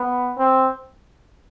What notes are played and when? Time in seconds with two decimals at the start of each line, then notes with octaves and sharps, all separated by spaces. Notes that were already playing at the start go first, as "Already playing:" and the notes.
Already playing: B3
0.37 C4